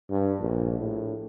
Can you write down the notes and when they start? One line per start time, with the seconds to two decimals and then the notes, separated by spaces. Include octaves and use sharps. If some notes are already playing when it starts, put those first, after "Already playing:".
0.10 G2
0.40 A#1
0.79 A2